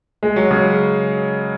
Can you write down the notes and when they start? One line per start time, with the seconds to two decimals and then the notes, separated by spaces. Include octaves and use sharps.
0.23 G#3
0.36 F#3
0.51 C#3